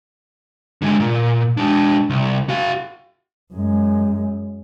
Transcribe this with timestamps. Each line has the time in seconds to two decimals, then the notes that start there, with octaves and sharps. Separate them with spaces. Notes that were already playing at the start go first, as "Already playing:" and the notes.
0.82 D3 G#3
1.00 A#2
1.57 G#3 D4
2.10 C2
2.49 F#4 F5
3.54 F#2 G#3